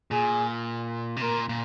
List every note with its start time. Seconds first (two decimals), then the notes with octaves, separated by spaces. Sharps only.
0.11 A#2 G#4
1.16 C3
1.21 A#2 A#4
1.49 A#2